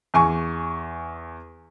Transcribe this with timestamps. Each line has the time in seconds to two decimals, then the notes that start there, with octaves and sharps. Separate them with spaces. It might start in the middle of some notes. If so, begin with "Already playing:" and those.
0.14 E2 G#5 C#6